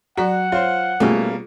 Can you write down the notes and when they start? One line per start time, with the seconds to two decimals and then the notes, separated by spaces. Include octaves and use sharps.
0.17 F#3 F#4 D5 F#5 A#5
0.52 F4 C5 C#5
1.00 B2 G3 A3 A#3 C#4 F4 G#4